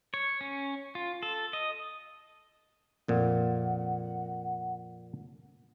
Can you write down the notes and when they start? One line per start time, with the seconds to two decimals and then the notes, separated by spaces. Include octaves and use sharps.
0.14 C#5
0.41 C#4
0.95 F4
1.23 A4
1.53 D#5
3.08 F2 A#2 F#5